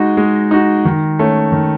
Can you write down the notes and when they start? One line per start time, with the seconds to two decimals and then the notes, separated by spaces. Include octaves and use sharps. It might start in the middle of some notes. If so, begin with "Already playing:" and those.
Already playing: G#3 D#4 F#4
0.17 G#3
0.51 D#4 F#4
0.85 D#3
1.19 A3 C#4
1.52 D#3